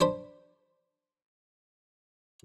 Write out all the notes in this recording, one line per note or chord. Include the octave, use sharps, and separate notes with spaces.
D4 C5 B5